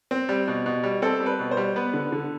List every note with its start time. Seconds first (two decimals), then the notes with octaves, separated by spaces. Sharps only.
0.11 C4
0.29 G3
0.48 B2
0.66 B2
0.83 G3
1.02 C4 A4
1.20 G3
1.26 B4
1.39 B2
1.51 C5
1.57 G3
1.76 B3 B4
1.94 D3
2.12 D3